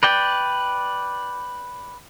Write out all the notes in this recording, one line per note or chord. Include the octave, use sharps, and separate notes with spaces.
B4 D5 G5